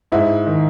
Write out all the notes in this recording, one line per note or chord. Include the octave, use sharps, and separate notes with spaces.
G#2 E4
D#3